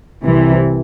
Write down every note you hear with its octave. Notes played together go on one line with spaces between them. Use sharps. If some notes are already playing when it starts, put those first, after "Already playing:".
C2 C3 E3